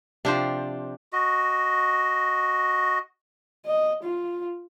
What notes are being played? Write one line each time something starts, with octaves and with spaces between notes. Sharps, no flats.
C3 F3 D4 G4 C5
F#4 D#5
D#5
F4